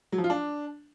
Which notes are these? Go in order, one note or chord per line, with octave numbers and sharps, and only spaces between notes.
F#3
F3
F4
D4